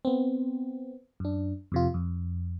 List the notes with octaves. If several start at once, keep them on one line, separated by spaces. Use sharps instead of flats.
B3 C4
F#2 D4
F2 C3 F4
F2